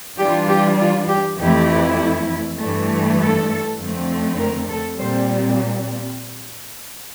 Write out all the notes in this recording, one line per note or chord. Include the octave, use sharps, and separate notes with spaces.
E3 G3 D4 F4 G4
G4
F4
G4
F2 E3 A3 E4 G4
G2 E3 A3
A4
F2 D3 A3 C4
A#4
A4
A#2 G3 C4 C5